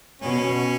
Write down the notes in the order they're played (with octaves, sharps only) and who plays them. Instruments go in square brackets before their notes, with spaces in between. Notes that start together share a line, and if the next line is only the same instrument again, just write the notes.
[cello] B2 [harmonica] C#4